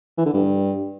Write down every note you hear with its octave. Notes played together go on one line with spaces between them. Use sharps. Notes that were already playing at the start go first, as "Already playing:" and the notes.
E3
D3
G2